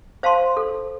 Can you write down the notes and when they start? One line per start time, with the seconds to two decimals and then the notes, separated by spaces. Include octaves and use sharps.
0.23 C5 F5 A5 C6
0.57 A4